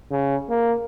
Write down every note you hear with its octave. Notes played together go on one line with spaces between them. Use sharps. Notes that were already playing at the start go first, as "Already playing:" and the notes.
C#3
A#3